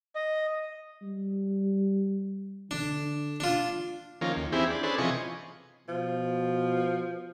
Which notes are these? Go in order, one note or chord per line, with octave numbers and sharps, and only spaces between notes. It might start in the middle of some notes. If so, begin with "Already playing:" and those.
D#5
G3
D3 D4
D4 F4
D#3 F3 A#3 C#4
D#2
E3 C4 E4 G4 G#4
D4
C#4 D4 G#4 A4 B4 C5
C3 E3 F3 D#5 G#5 C#6
B2 F3